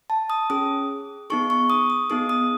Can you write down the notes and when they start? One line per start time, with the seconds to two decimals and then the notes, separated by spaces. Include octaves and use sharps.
0.10 A5
0.30 D#6
0.50 C#4 G#4 D#6
1.30 B3 D#4 G#4 C#6
1.50 C#6
1.70 D#6
1.90 D#6
2.10 B3 D#4 G#4 D#6
2.29 D#6